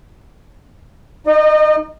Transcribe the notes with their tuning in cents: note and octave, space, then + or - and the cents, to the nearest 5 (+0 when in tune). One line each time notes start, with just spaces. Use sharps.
D#4 +0 D#5 -35